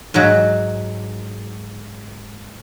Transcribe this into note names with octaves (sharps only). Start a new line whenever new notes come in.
G#2 F#3